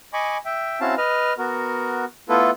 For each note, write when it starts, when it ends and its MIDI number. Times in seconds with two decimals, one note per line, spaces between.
0.13 0.37 75
0.13 0.37 80
0.13 0.37 83
0.13 0.37 85
0.13 0.37 86
0.45 0.80 76
0.45 0.80 79
0.81 0.95 60
0.81 0.95 61
0.81 0.95 64
0.81 0.95 66
0.81 0.95 77
0.81 0.95 81
0.97 1.33 71
0.97 1.33 75
0.97 1.33 89
1.38 2.05 59
1.38 2.05 66
1.38 2.05 70
2.29 2.51 57
2.29 2.51 59
2.29 2.51 64
2.29 2.51 65
2.29 2.51 69
2.29 2.51 71